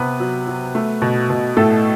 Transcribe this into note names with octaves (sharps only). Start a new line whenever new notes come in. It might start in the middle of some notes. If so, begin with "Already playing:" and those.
Already playing: C3 B3 B4
F#3
F#3
A3
B2
B2
A2 A3 A4